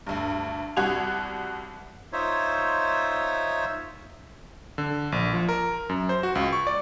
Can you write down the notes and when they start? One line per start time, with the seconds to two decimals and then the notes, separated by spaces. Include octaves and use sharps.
0.07 D2 G2
0.77 C2 G3 F#4 G#6 F7
2.13 D#4 F4 C5 C#5 E5
4.78 D3
5.12 A#1
5.34 F3
5.49 A#4
5.89 F#2
6.09 C5
6.23 F#4
6.35 C#2
6.53 C#6
6.67 D5